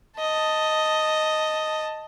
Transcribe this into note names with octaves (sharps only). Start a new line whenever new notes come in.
D#5 A5